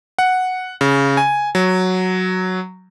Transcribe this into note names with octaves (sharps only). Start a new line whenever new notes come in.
F#5
C#3
G#5
F#3